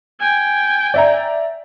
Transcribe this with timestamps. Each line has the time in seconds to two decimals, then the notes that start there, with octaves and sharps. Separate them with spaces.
0.20 G5 G#5
0.94 D5 E5 A#5